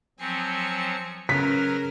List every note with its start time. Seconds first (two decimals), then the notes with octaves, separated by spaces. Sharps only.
0.19 F3 F#3 C4 G#5 C#7
1.29 C#3 F#3 A#4 B4 F6 B6